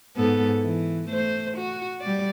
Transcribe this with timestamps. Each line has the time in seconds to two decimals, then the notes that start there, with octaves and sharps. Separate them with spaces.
0.16 G#2 B3 A4
0.60 E3
1.09 A3 C5
1.58 F#4
2.01 G3 D5